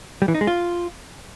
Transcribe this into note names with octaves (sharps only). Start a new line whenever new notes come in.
G3
E3
D#4
G#3
F4